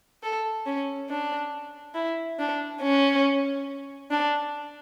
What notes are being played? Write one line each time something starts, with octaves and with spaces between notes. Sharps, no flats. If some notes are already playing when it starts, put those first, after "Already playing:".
A4
C#4
D4
E4
D4
C#4
D4